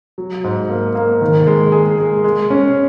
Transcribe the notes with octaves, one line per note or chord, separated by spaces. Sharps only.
F#3
G#2
A#3
A#3
D#3
G#3
G#4
G#3
G#3
C#4